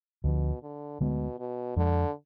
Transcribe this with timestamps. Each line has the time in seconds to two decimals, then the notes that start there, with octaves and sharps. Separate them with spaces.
0.23 D2 B2 D3 F3
0.63 D3
1.01 D2 B2 D3 G#3 B3
1.39 B2
1.76 F2 D3 F3 G#3